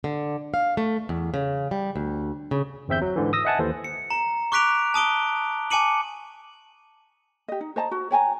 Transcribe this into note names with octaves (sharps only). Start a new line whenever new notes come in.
D3
F5
A3
E2
C#3
G3
D2
C#3
G1 E2 C4 E5 G6
F#3
G#2 D3 E3
D#6 E6 A#6
D#5 E5 F#5 G#5 A5
D#2 E3 A4 C5
C#7
A#5
C#6 D6 F#6 B6 D7 F7
A5 D#6 D7 G7
G#5 A5 D6 C#7 D#7 F#7
G4 D#5
D#4
C5 D#5 A5 A#5
F#4
C#5 G5 G#5 A#5